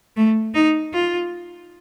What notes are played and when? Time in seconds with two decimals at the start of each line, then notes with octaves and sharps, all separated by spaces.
0.16 A3
0.54 D#4
0.93 F4